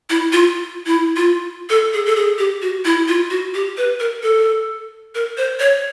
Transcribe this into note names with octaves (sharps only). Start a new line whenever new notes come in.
E4
F4
E4
F4
A4
G#4
A4
G#4
G4
F#4
E4
F4
F#4
G4
B4
A#4
A4
A#4
C5
C#5